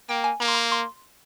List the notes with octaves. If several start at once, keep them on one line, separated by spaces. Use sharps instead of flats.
A#3 G5
G#5
A#3 A#5
C6
A#5
C6